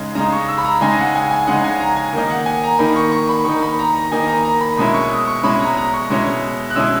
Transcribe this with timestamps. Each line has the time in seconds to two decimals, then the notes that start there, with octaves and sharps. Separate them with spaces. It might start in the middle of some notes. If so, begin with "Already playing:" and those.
Already playing: C#3 G#3 D#4
0.15 C#3 G#3 D#4 A#5
0.33 C#6
0.48 E6
0.58 B5
0.65 A#5
0.81 C#3 G#3 D#4 G#5
0.99 F#5
1.15 G#5
1.31 G#5
1.47 C#3 G#3 D#4 F#5
1.64 G#5
1.80 A#5
1.96 G#5
2.13 D#3 A#3 D#4
2.30 F#5
2.46 G#5
2.64 A#5
2.79 D#3 A#3 D#4 B5
2.96 C#6
3.12 C#6
3.29 B5
3.45 D#3 A#3 D#4 C#6
3.62 B5
3.79 A#5
3.95 A#5
4.12 D#3 A#3 D#4 G#5
4.28 A#5
4.45 A#5
4.61 B5
4.77 B2 G#3 C#4 E4 B5
4.94 C#6
5.11 D#6
5.28 C#6
5.43 B2 G#3 C#4 E4 B5
5.60 A#5
5.77 A#5
5.94 C#6
6.10 B2 G#3 C#4 E4
6.70 F#6
6.75 B2 G#3 C#4 E4 E6